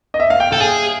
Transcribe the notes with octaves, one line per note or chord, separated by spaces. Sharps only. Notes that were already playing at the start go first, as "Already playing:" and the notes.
D#5
E5
F5
G5
A4 G5
G#4 G#5